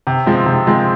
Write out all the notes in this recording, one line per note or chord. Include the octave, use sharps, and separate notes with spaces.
C3
F3 G#3 C4
C3
F3 G#3 C4